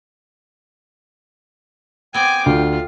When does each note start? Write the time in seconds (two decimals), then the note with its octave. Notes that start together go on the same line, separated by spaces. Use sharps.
2.14 B3 C4 G5 G#5 D6
2.46 D2 F4